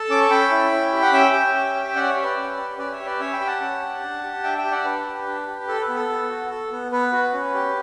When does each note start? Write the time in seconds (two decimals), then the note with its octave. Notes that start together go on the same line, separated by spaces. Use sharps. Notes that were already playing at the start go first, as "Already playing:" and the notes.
Already playing: A4 A5
0.10 C#4 D6
0.21 C#6
0.30 C#4 G5 B5
0.51 E4
0.71 C#4
0.92 G4
1.02 F#5
1.12 C#4 E5 G5
1.33 G4
1.54 C#4
1.75 G4
1.95 C#4 D5 F#5
2.09 C#5 E5
2.17 G4
2.23 B4 D5
2.37 C#4
2.57 G4
2.78 C#4 B4 D5
2.92 C#5 E5
2.99 G4
3.05 B4 D5
3.20 C#4 C#5 E5
3.33 G5 B5
3.40 G4
3.47 F#5 A5
3.61 C#4
3.81 G4
4.02 D4
4.23 G4
4.44 D4 E5 G5
4.58 E5 G5
4.64 G4
4.71 D5 F#5
4.85 D4 B4
5.06 G4
5.27 D4
5.47 G4
5.68 A4
5.82 B4
5.89 B3
5.95 A4
6.09 B3
6.30 F#4
6.50 A4
6.71 B3
6.92 B3 B4
7.13 F#4
7.34 C#4
7.54 G4